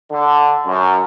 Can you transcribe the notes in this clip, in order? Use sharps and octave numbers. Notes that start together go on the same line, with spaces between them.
D3
F#2